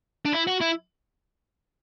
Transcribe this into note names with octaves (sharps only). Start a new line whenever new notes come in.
D4
E4
F#4
E4